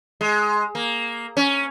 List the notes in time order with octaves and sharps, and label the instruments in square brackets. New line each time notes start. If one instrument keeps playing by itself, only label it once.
[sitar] G#3
A#3
C#4